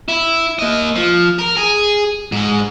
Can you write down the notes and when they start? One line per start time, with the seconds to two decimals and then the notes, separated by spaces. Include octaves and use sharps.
0.09 E4
0.59 A#3 D#5
0.96 F3
1.38 A#4
1.57 G#4
2.32 G#2 G#3